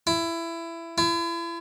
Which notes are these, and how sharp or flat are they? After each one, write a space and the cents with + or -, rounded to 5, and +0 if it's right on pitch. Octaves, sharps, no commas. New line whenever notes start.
E4 +20
E4 +40